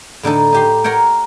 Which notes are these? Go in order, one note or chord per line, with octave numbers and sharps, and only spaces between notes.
A2 D3 D#4 A4
D#4 G4 C6
A#4 C#5 F#5 G5